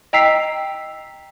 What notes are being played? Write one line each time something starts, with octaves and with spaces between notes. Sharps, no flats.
D#5 G5 A#5 E6 B6 C7